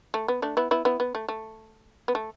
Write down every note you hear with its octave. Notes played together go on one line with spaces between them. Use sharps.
A3
B3
A3 D4
B3 E4
B3 E4
B3 E4
B3
A3
A3
B3
A3